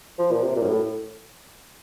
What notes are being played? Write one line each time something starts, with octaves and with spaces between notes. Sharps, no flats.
F3
A#2
C3
A#2
F#2
A2